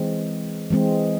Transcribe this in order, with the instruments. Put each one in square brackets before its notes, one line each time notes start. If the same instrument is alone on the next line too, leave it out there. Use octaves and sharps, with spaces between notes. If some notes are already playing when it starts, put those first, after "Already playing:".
Already playing: [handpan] E3 G#3 C4
E3 G#3 C4